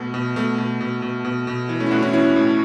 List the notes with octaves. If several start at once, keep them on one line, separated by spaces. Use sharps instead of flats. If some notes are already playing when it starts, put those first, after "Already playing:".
Already playing: B2 A3
B2
B2 A3
B2
B2
B2
B2
B2
E3
A3 C#4
E4
A2 D4 F#4
C#4 E4
E3 C#4 E4
A2